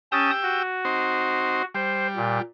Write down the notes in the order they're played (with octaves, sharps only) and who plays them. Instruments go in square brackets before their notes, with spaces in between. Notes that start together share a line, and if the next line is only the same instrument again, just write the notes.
[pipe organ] C#4 A5 D#6 [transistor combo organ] G4 G5 E6
[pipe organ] F#4
[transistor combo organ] C4 D#4 C5
[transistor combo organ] G3 [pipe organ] C5
[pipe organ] A#2